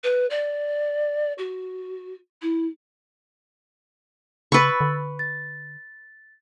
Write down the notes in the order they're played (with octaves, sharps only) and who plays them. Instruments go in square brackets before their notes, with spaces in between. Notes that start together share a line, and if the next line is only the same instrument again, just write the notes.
[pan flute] B4
D5
F#4
E4
[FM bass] C#3 [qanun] B4 C#6 [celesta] B5 E6 A6
[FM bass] D3
[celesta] A6